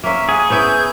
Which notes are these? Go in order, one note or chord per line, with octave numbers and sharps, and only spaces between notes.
A#3 C#4 E5
G#4 F#5
B3 C#4 E4 G6